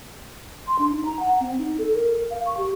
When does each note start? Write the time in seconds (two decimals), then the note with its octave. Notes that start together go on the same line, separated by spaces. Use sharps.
0.67 C6
0.79 D4
0.91 D#4
1.05 A#5
1.20 F#5
1.40 C4
1.58 D#4
1.78 A4
1.94 A#4
2.30 F5
2.46 C#6
2.58 G4